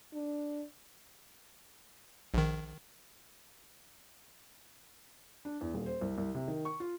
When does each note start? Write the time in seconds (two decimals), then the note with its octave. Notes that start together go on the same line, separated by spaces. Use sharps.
0.14 D4
2.34 A#1 D#3
5.45 D4
5.61 E2
5.74 D#1
5.86 C5
6.01 C2
6.18 C2
6.35 C3
6.48 D#3
6.65 C#6
6.80 F4